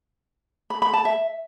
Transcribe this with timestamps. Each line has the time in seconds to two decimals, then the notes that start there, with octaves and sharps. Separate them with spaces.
0.70 B5
0.82 B5
0.93 A5
1.05 E5